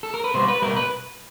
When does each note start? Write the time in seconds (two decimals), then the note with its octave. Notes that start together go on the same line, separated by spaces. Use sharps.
0.03 A4
0.14 A#4
0.24 B4
0.34 B2 G3 C5
0.48 B4
0.62 B2 G3 A#4
0.76 B4